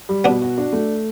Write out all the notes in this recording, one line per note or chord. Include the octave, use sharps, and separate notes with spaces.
G3
B2 B3 D4
F#4
D4
A3